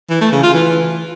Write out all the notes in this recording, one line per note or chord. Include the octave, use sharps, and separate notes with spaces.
E3
A3
C#3
F4
E3